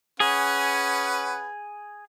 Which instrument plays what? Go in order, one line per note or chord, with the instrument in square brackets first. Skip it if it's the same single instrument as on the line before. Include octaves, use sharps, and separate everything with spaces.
[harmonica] C#4 B4 F#5 [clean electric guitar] G#4